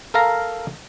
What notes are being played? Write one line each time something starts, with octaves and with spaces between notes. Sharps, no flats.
A4 A#4 F5 A#5